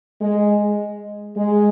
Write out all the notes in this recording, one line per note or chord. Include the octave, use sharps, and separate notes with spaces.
G#3
G#3